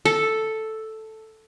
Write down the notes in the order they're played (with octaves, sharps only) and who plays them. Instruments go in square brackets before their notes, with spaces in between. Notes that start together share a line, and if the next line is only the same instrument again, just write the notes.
[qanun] A4